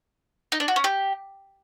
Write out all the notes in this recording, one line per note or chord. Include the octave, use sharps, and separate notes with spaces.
D#4
D4
F#4
C#4
G4